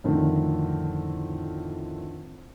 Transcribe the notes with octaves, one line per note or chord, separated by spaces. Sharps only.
F2 A2 D3 D#3